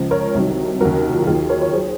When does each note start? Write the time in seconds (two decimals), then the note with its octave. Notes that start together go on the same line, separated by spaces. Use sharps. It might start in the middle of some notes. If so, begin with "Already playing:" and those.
Already playing: C#2 C#3 F3
0.11 A#4 C#5
0.34 C2 C3 D#3 F#3
0.80 D#2 C#3 F#3 F#4 A#4
1.12 F4
1.20 F#4
1.27 D#2 D#3 F#3 F4 G#4
1.49 A#4 C#5
1.61 C#5
1.73 F#3 G#4 C5